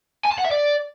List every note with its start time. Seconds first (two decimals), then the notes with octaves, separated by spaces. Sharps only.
0.25 G#5
0.31 A5
0.38 F#5
0.45 E5
0.51 D5